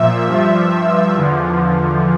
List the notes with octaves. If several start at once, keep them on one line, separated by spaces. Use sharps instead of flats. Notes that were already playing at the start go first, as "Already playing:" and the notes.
Already playing: A#2 F3 E5
G2 F3
E2 D3 F3